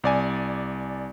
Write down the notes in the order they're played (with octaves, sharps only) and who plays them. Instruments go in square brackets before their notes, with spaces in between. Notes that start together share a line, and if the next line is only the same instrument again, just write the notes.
[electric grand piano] C2 D5 G#5